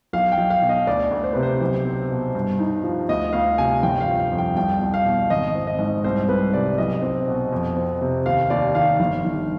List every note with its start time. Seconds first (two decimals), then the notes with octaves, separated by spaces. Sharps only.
0.13 B1 F5
0.32 G5
0.37 B1
0.50 F5
0.62 B2
0.69 D#5
0.87 D2 D5
1.11 D2
1.24 C5
1.33 C3 B4
1.43 C5
1.61 B1
1.85 C4
2.11 B2
2.35 G2
2.59 D#4
2.84 F3
3.09 D2 D#5
3.33 D2 F5
3.58 C3 G#5
3.83 G1 G5
4.01 F5
4.08 F3
4.20 F5
4.32 F2
4.38 G5
4.56 C2 G5
4.81 C2
4.94 F5
5.06 B2
5.30 G#1 D#5
5.55 C4
5.67 D#5
5.79 G#2
6.04 C2 C5
6.28 C2 B4
6.54 C3 D5
6.78 B1 D#5
7.02 C4
7.28 B2
7.52 F2
7.76 C4
8.01 C3
8.26 D#2 F5
8.50 D#2 D5
8.75 D#3 F5
9.00 G1
9.25 G1